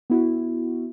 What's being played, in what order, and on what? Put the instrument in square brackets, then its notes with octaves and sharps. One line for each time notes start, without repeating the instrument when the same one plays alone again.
[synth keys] B3 E4 F#4